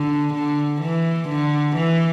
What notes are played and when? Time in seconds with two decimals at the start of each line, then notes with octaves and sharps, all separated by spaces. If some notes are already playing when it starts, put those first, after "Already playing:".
Already playing: D3
0.34 D3
0.81 E3
1.29 D3
1.76 E3